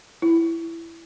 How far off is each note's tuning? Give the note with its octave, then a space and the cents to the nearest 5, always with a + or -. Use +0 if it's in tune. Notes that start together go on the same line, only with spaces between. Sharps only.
E4 +15